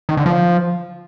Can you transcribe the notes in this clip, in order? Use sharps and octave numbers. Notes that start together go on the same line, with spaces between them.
D#3
D3
F3